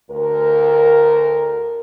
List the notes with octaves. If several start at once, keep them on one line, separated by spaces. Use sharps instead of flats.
D2 A#4